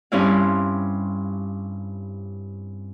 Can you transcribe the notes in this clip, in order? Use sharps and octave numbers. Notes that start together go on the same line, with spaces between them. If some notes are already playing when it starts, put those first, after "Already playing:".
G2 C4 C#4 E4 F5